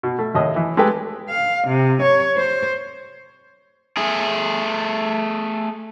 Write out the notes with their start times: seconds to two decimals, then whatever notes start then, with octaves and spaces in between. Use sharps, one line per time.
0.03 B2
0.19 A3
0.35 D#2 A2 D#5 D#6
0.56 E3
0.77 G#3 A3 G4 A4 B4 G5
1.29 F5
1.67 C3
2.02 C#5
2.36 C5
3.98 A3 G#4